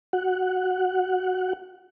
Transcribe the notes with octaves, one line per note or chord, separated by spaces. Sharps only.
F#4 F#5